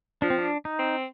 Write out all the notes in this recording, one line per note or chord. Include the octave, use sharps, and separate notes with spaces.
F3 D4
C4
D4
D#4
C4